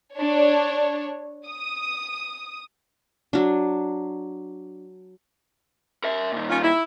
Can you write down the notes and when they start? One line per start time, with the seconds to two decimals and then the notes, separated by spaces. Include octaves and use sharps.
0.17 D4 C#5
1.47 D#6
3.33 F#3 D4
6.04 A#4 E5
6.32 A#2 D#3
6.49 C#4 F4
6.63 E4